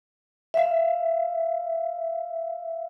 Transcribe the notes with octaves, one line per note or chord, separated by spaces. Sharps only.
E5 F5